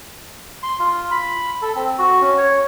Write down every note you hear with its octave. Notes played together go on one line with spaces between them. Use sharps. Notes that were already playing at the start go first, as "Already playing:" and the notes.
C6
F4
B5
A4
C4
F#4
C#4
C#5